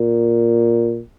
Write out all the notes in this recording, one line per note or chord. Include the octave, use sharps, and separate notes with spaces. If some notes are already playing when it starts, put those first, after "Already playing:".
Already playing: A#2